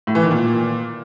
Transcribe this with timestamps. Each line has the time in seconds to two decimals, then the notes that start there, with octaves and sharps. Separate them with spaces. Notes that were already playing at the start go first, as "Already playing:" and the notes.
0.07 A2
0.15 E3
0.23 D#3
0.31 A#2